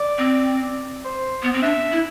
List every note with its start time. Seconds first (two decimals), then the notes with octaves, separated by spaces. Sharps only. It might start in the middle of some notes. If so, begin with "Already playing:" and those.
Already playing: D5
0.18 C4
1.05 C5
1.42 B3
1.53 C4
1.63 D4 E5
1.92 E4